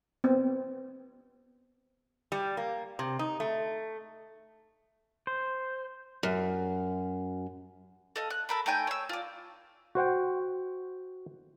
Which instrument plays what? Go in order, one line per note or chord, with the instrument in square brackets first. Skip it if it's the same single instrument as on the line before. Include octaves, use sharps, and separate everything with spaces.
[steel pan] B3 C4
[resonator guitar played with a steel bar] G3
A#3
C3
D#4
A3
[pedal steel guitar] C5
[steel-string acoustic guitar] F#2
[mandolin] A4 D#5 F5
F#6
A4 A#4 B5
A3 D#4 G5 G#5
C#5 E6
F4 D5
[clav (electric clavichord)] F#4 C5 F#5 G5